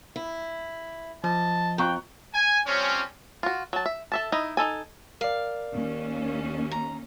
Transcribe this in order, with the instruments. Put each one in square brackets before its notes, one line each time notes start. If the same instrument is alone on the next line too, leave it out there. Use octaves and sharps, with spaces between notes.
[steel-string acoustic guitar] E4
[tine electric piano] F3 [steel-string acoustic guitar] D#5 [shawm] A5
[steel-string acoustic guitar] F2 [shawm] G5 [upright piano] A#5 C#6 F#6
[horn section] G#5
F3 G3 C4 C#4
[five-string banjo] F4 F#4
F#3 A5
E5
A4 E5 A5
D#4 E4 D#5
D#4 E4 A4 G#5
[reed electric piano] A#4 D5 [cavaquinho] F5
[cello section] D#2 C#4
[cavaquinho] A#5